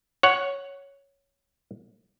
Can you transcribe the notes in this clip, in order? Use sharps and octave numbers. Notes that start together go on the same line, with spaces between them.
C#5 F#5